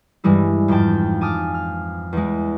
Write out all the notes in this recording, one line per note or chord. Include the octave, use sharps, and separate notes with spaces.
G2 E3 G3 G#3 E4
F2 G#2 F3 G5 A5
G#5 A5 D6 D#6 F6
F6
E2 G#3